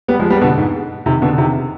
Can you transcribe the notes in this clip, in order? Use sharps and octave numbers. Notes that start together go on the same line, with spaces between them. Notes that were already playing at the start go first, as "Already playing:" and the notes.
G3 B3
F3 G#3
G3 B3
B2 D3
G#2
C3 D#3
B2 D3
C3 D#3